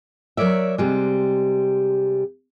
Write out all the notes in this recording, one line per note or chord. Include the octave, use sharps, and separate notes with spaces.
F#3 A#4 C#5 D5 E5
C3 G3 G#3